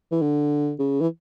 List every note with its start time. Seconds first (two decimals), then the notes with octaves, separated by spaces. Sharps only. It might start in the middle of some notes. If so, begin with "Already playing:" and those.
0.12 E3
0.22 D3
0.79 C#3
1.01 E3